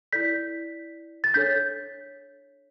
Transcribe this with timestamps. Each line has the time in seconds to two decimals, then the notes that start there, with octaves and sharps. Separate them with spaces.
0.13 E4 A4 D5 G6 B6
1.24 A6
1.34 D4 A4 C#5 G6 B6